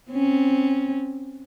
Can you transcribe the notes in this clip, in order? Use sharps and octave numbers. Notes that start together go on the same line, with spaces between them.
C4 C#4